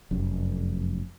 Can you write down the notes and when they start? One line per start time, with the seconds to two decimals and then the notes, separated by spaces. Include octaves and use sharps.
0.11 F1 F#2